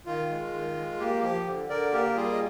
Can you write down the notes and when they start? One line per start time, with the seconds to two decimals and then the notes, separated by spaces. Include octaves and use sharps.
0.06 D#3 F4
0.30 G#3
0.53 D#3
0.76 G#3
0.99 A#3 G4
1.22 F3 G4
1.46 D3
1.69 D3 A#4 D5
1.92 A#3 G4 A#4
2.16 G3 F4 G#4
2.33 D#5